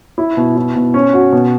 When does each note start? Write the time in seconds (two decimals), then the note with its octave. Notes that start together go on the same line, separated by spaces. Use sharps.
0.18 E4
0.37 B2
0.56 E4
0.76 B2
0.94 C#4
1.13 F#4
1.32 B2